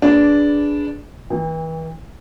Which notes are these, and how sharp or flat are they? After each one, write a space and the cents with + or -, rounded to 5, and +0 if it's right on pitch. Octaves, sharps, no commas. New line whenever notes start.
D4 -10 G#4 +0 B4 +0
E3 -35 G5 +40